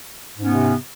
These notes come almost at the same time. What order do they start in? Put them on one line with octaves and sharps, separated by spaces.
G#2 C#4 B3 C3